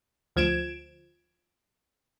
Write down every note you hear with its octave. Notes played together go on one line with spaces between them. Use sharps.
D2 F3 G#6 D7 E7